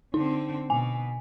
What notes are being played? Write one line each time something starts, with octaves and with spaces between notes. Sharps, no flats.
D3 C4 D#4
B2 G#5